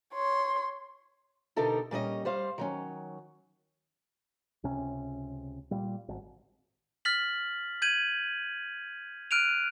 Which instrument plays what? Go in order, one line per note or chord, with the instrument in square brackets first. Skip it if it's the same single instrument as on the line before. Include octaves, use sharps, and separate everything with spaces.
[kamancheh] C#5 C6
[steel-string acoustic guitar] B2 D3 D#4 G4 A4 A#4
A#2 G3 C#4 D#5
G3 C5 F5
D#3 F#3 C#4
[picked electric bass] C#2 C3 C#4
A#2 G3
G#1
[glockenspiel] F6 A6 B6 F#7
G6 G#6 D#7 F#7
F6 F#6 D7 D#7 F7